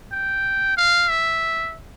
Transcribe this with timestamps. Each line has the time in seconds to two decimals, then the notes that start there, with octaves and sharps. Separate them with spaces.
0.12 G5
0.77 F5
1.09 E5